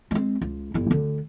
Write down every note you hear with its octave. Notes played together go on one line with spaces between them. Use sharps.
G#3 C4
C#2
G1 E4
D2 D3